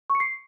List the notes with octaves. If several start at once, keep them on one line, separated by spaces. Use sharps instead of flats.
C#6
C#7
C7